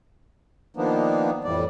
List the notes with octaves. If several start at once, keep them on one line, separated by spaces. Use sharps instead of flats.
D#3 F3 A#3 B3 D4 D#4
F2 A2 E3 G3 D5